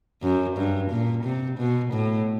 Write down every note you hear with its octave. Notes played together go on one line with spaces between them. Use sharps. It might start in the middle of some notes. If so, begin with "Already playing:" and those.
F#2
G2
A#2
C3
B2
A2